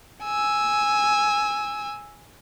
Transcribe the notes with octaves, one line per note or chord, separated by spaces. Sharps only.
G#5 E6